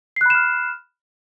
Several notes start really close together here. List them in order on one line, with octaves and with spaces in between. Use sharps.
C7 F#6 B5 E7 F6